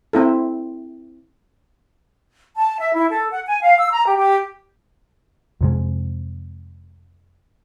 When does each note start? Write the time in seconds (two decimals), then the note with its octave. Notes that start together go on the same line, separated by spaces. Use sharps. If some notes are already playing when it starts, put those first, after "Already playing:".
0.13 C4 E4 A4
2.57 A5
2.79 E5
2.93 E4
3.10 A4
3.30 F#5
3.46 G#5
3.62 F5
3.78 E6
3.91 A#5
4.06 G4
4.18 G4
5.61 F2 C3 G#3